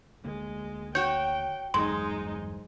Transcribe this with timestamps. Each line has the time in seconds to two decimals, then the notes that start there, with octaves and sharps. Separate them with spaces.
0.25 D2 D3 G#3 A#3
0.95 F#4 C#5 G5 G6
1.74 G1 E2 G#2 F#3 G#3 D#4 C6